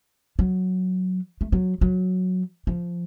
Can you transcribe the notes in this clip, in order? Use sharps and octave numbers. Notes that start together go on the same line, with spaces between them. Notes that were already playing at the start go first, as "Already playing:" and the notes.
F#3
A3
F#3
F#3
F3